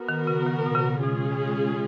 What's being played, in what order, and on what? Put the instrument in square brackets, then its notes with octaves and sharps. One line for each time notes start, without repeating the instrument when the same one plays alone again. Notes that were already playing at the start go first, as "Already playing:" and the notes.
Already playing: [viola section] B3 F#4 A#4
[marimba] D#3
C#3
D#3
B2
C#3
[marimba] B2 [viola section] G#3 C#4 F4 G#4